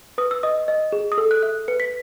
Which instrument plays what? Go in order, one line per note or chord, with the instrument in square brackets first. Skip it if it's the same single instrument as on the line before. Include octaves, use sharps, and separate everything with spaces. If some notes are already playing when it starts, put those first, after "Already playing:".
[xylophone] B4 D#6
E6
D#5 D#6
D#5
G#4
D#6
A4 E6
F#6
E5 F#6
B4 C#7
B6